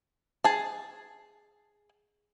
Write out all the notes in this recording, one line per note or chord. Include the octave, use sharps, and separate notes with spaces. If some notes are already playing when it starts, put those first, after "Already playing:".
G#4 A5